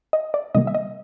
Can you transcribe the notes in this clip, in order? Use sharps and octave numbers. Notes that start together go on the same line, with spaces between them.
D#5
D5
C3 D#3 G3 A#3 D#5
E5
D#5